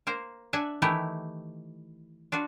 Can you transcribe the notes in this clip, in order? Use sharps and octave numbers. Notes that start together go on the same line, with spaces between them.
A#3 A#4 C5
D4 E5 F#5 G#5
D#3 E3 A3 E4 G4
D4 F4 F#4